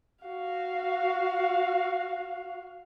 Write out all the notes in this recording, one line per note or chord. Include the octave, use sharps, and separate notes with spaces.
F#4 F5